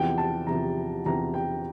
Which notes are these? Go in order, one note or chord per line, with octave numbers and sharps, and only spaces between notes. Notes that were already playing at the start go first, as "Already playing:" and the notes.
Already playing: E2 C3 F3 G5
A5
E2 C3 F3 A#5
E2 C3 F3 A#5
G5